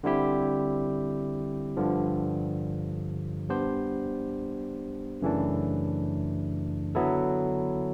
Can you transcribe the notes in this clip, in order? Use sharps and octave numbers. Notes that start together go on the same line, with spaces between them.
D3 G3 C4 E4 G4
G2 D3 F3
G3 B3 D4 G4 C5
F#2 C#3 E3 A3 D4
D3 F#3 B3 E4 A4